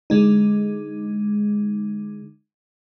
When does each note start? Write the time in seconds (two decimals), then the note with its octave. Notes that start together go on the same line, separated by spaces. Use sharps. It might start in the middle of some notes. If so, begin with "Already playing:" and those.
0.10 D3 G#3 D#4